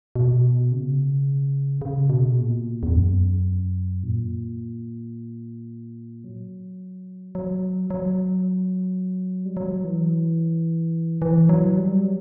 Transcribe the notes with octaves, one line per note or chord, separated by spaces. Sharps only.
B2
C#3
C#3
B2
A#2
E2
F#2
A#2
F#3
F#3
F#3
G3
F#3
E3
E3
F#3
G3
F#3